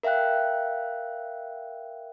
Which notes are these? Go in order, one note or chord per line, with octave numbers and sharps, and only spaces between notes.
A#4 E5 F5 G5 F#6